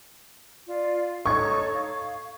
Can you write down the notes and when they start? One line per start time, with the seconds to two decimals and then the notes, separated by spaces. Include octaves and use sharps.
0.67 F4 D5
1.26 D#4 A4 C#5 C#6 G#6
1.73 F5